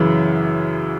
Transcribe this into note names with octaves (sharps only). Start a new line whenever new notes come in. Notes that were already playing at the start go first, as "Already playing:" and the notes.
Already playing: F#2 C#3 E3